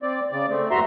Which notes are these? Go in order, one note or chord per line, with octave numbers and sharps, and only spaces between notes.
C4 D5
C#3 D5
A3 C4
E2 G2 F#4 E5 A#5 C6